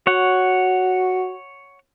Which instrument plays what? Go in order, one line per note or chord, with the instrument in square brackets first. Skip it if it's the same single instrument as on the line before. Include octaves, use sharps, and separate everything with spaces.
[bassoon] F#4 [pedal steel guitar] C#5 F#5